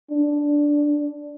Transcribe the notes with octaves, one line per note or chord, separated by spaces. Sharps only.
D4